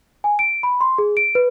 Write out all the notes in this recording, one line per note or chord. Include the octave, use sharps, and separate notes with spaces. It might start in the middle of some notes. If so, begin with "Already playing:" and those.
G#5
D7
B5
C6
G#4
D7
B4